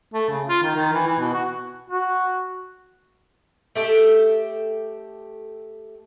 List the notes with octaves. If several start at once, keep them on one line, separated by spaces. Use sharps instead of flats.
A3
C#3
F4
D#3
D#3
E3
E3
B2
F#4
F#4
A3 G4 A4